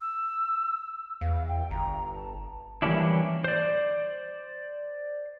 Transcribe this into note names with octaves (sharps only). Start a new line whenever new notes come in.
E6
E2 F5
G5
G1 A#5
A5
E3 G3 A#3 C#4 D4 E4
C5 D5